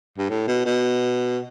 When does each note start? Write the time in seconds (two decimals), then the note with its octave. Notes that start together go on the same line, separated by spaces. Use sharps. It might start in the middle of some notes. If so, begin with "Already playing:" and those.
0.18 G2
0.30 A2
0.48 B2
0.66 B2